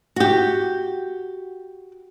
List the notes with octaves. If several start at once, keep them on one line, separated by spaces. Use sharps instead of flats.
F#4 G4